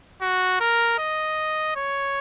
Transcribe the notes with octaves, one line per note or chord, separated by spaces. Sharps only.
F#4
A#4
D#5
C#5